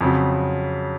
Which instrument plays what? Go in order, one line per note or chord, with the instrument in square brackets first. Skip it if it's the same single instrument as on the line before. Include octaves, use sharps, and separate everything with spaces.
[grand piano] F2 C#3 F#3